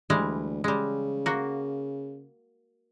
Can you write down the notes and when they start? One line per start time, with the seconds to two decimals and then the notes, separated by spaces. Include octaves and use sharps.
0.10 D2 E3 G3 G#3
0.64 C#3 G3 G#3
1.26 A#3 F#4